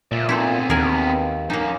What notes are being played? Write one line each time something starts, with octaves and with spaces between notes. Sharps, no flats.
A#2 D5 E5
A3 B3 C4 D#4 E4
D#2 G#4 A#4 G#5
F#2 A#3 D#4